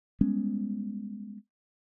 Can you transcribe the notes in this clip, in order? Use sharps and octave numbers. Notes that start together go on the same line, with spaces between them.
G3 G#3 B3 C#4